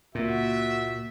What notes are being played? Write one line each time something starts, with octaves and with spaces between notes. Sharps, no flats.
C#2 A#2 A#3 F#4 E5